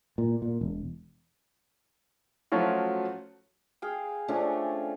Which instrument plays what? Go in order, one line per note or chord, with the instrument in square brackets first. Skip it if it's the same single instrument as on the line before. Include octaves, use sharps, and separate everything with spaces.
[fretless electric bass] A#2
A#2
E1
[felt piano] F3 F#3 A3 C#4 F4 F#4
[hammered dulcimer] G#4 F5 G5
F3 A3 C#4 D4